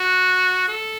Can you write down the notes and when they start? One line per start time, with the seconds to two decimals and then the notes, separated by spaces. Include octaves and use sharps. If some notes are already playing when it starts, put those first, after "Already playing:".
Already playing: F#4
0.68 A4